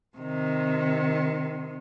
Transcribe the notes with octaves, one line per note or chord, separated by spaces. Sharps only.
C3 D#3